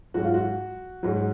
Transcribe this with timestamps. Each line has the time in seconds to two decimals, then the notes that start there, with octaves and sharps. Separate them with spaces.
0.14 G#2 F#3 F#4
0.24 F4
0.34 F#4
1.03 G#2 F#3